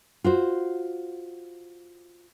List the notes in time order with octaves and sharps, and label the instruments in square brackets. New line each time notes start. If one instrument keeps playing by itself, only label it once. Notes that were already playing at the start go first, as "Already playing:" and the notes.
[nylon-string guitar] F4 F#4 C5